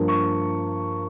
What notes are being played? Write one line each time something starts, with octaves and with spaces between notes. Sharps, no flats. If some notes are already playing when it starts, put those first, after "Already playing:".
Already playing: G2 F3 A#3
C#6